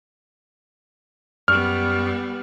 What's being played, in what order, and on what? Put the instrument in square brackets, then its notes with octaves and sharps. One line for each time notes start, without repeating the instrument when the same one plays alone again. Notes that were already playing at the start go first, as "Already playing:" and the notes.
[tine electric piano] F#2 D5 C#6 [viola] G3 B3 [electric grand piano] F6